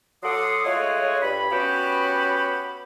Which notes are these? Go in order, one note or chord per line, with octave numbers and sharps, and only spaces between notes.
F#3 A4 F#5 C6 D6 D#6
G#3 A3 F4 F#4 G#4 C#5
G2 B5
B3 C#4 F#4 G4 G5 B5